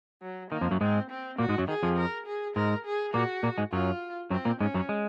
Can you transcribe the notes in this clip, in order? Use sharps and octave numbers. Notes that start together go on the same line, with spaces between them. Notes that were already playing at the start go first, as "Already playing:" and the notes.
F#3
D#3 A#3
F2 F3
F#2 F#3
G#2 G#3 C4
C4
A#2 A#3 F#4
G#2 G#3
F#2 F#3
D#3 G#4
F2 F3
A#4
G#4
G#2 G#3 A#4
G#4
A#2 A#3 F#4
A#2 A#3
G#2 G#3
F#2 F#3 F4
F#2 F#3 C4
A#2 A#3
G#2 G#3 C#4
F#2 F#3
G#3